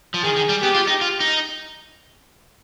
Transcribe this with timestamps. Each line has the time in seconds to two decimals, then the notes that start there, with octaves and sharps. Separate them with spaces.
0.14 F3
0.23 D#3 G#4
0.36 D#3
0.49 G3
0.62 B3 G4
0.74 F4
0.87 D#4
1.01 F4
1.20 D#4